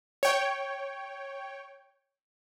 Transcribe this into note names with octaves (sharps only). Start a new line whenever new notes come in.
C#5 G5